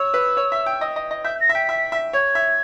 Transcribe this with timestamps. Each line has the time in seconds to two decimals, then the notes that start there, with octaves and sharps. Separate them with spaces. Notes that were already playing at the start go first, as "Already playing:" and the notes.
Already playing: C#5 E6
0.14 B4
0.37 C#5
0.52 E5
0.66 G5
0.81 D#5
0.96 D#5
1.11 D#5
1.24 E5 G6
1.40 A#6
1.49 E5
1.54 G5 B6
1.69 E5
1.92 E5
2.13 C#5 G#6
2.35 E5